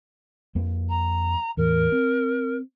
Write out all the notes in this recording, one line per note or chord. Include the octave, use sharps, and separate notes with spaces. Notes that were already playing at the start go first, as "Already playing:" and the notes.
F2 A#3
A#5
E2 A2 E3 A#4
C4